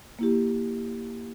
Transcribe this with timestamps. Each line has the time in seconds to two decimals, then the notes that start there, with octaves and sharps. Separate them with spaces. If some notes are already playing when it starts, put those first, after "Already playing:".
0.19 A#3 E4 G4